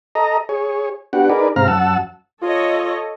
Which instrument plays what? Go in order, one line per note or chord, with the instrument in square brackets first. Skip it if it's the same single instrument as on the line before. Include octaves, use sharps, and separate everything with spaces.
[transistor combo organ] A4 D#5 A#5
G#4 C#5
B3 D4 F#4 G4 F#5
D#4 G#4 A#4 B4 D5
G#2 C3 C4 F5 A#5 F6
F#2 F#5 A5 E6
[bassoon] F4 [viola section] A4 C#5 D#5